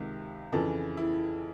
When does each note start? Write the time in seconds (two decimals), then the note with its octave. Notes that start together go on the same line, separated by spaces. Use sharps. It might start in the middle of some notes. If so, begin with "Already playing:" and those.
Already playing: C#2 C3 D#3
0.52 F2 C#3 E3 A4
0.97 E4